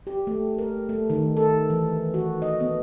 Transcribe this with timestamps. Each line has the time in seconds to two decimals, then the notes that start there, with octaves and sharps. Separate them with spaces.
0.07 G4
0.27 A3
0.58 A#4
0.89 A3
1.10 D#3
1.37 A4
1.70 E3
2.14 F#4
2.42 D#5
2.60 B3